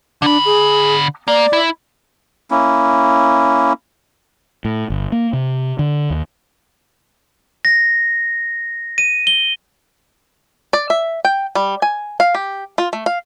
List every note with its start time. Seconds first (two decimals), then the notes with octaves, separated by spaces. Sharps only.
0.22 D3 D4 B5
0.45 G#4
1.28 A#3 D5
1.53 E4
2.51 A#3 C#4 E4
4.65 A2
4.90 G1
5.12 A#3
5.33 C3
5.79 D3
6.10 D#2
7.65 A#6
8.98 D#7
9.27 G7
10.73 D5
10.90 E5
11.25 G5
11.55 G3
11.82 G#5
12.20 F5
12.35 G4
12.78 F4
12.93 A3
13.06 F5